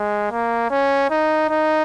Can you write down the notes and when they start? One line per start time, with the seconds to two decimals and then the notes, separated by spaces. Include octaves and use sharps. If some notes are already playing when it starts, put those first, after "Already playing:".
Already playing: G#3
0.31 A#3
0.71 C#4
1.11 D#4
1.50 D#4